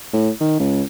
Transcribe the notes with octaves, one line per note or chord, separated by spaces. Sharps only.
A2
D#3
C#2